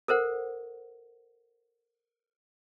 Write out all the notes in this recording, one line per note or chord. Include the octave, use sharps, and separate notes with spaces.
A4 A#4 C5 F#5